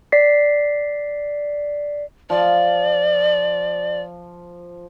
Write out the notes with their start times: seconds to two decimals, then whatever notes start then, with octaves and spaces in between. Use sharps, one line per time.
0.12 D5 B6 C7
2.30 F3 D5